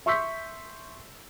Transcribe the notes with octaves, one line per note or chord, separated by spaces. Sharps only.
E5 C6 C#6 E6 G6 B6